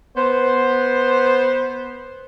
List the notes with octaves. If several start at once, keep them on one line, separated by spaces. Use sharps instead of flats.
B3 C5